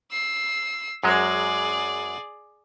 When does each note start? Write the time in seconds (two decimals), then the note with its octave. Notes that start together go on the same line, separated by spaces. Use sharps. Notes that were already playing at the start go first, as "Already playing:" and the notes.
0.12 E6 C7
1.04 F#2 F#3 G#3 G#4 D5